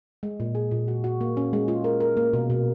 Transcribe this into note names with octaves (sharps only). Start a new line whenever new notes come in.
G#3
A#2
G#4
A#2
F#4
F#4
A#3
C#4
G#3
F4
A#4
A#4
A#3
B2
B2